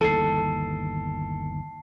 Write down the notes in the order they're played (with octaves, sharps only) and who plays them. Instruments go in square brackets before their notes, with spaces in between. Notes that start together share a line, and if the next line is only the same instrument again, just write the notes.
[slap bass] G1 D#2 E3 [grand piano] A4 [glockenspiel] A5 C7